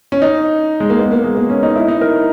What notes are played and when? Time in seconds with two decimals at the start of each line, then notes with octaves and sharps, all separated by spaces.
0.12 C#4
0.22 D#4
0.80 G#3
0.90 A#3
0.99 B3
1.12 A#3
1.24 G#3
1.37 A#3
1.50 C#4
1.63 D#4
1.76 E4
1.88 D#4
2.01 A#4